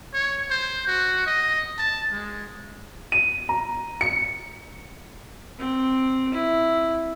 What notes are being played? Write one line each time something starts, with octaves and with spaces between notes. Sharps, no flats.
C#5
C5
F#4
D#5
A5
G#3
D#7
A#5
C#7
C4
E4